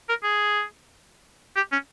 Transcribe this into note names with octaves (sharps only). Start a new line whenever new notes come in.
A#4
G#4
G4
C#4